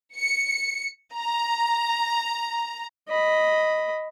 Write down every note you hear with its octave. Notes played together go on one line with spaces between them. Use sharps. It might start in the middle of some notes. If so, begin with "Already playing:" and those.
C#7
A#5
D#5 B5